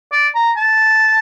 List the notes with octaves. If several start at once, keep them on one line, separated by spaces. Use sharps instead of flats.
D5
A#5
A5